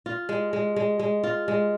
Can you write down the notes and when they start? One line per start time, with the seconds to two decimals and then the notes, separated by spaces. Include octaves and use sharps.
0.06 F4
0.29 G#3
0.53 G#3
0.76 G#3
0.99 G#3
1.23 F4
1.48 G#3